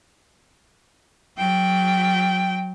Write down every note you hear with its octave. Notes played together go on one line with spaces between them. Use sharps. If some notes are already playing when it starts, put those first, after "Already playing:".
F#3 G5